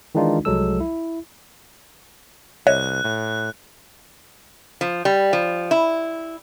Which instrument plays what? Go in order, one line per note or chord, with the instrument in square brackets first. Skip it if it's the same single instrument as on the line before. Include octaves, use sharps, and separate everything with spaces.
[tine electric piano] D#3 E3 G#3 D4 D#4 F4
C2 F3 F#3 G#3 A4 E6
E4
[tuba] C2 [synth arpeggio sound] C#5 D#5 E5 [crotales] F#6
[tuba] A2
[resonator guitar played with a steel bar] F3
G3
F3
E4